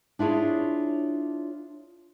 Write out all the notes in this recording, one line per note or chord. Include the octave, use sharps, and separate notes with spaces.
D4 E4 F4 G#4 C#5